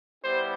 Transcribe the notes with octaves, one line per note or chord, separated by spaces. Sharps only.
G3 B3 E4 G4 C5